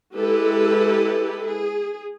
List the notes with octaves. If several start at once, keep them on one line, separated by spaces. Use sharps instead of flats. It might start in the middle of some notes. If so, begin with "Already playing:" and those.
G#3 E4 G4 A4 B4
G#4